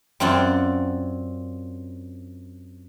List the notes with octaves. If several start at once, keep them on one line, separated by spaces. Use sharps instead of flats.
F#2 C4 F4 D5 F#5